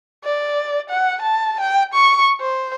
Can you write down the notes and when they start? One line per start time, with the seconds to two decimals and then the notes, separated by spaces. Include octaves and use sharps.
0.24 D5
0.90 F#5
1.22 A5
1.61 G5
1.94 C#6
2.41 C5